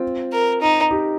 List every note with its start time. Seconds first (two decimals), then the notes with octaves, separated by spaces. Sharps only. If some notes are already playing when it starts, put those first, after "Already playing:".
Already playing: C4 F4
0.32 A#4
0.61 D#4
0.91 D#4 G4